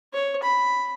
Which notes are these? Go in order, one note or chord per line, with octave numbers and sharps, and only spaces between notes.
C#5
B5